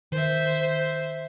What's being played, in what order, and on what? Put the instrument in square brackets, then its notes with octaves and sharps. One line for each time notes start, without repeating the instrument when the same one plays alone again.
[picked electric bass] D#3 [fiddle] C5 E5